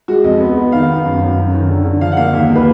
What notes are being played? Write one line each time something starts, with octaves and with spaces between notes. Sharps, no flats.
G#3 F#4
F2 D#5
B3
B3
D#3 F5
B3
F#2
F#2
F#2
D#3
D3
D3
F3 F5
F#5
A#3 F5
D#2
A#3
B4